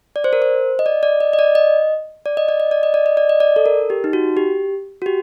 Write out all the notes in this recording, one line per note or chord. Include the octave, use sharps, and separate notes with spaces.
D5
C5
A#4
C5
D#5
D5
D5
D#5
D#5
D5
D#5
D5
D#5
D5
D#5
D5
D#5
D5
D#5
D5
D#5
D5
A4
A#4
G4
D#4
F#4
G4
F#4
G4